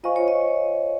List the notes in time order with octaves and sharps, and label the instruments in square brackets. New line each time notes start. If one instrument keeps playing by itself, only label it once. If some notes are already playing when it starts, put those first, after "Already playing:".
[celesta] F4 C5 F5 G#5 C#6 [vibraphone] D#5
[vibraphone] C#5
D#5